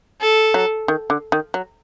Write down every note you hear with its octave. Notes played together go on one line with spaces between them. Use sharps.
A4
F#3
D#3
D3
D#3
F#3